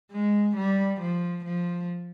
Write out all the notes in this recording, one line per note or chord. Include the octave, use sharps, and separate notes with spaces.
G#3
G3
F3
F3